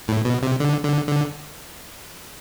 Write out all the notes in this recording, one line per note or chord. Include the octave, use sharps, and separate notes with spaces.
A2
B2
C3
D3
D3
D3